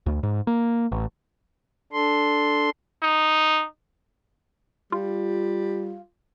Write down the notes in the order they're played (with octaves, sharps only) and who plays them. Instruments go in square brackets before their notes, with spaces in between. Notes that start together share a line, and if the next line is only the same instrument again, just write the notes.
[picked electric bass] D2
G#2
A#3
A1
[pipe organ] D4 A4 C6
[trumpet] D#4
[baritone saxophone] G3 [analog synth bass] F4